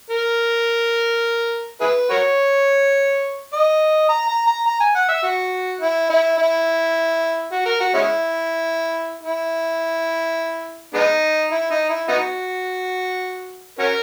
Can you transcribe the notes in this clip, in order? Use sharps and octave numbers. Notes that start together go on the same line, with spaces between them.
A#4
E4 G#4 B4
F#4 A#4 C#5
D#5
A#5
A#5
A#5
A#5
G#5
F#5
E5
F#4
E4
E4
E4
F#4
A#4
F#4
G#3 C#4 E4
E4
G#3 B3 D#4
E4
D#4
E4
B3 D#4 F#4
C#4 F#4 A#4